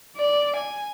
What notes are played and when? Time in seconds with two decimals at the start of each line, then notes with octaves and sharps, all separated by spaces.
0.17 D5
0.56 G#5